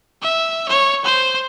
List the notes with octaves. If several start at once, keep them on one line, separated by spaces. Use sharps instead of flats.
E5
C#5
C5